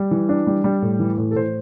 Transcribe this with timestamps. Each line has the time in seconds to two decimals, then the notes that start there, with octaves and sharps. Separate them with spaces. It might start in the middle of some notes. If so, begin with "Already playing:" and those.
Already playing: G3
0.11 E3
0.29 D4
0.47 G3
0.64 G3
0.82 A2
0.99 E3
1.18 A2
1.31 A4
1.35 A2 C5